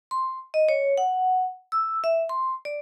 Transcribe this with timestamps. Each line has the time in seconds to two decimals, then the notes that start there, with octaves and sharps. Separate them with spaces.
0.11 C6
0.54 D#5
0.69 C#5
0.98 F#5
1.72 E6
2.04 E5
2.29 C6
2.65 D5